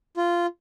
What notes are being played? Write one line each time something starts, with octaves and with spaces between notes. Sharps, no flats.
F4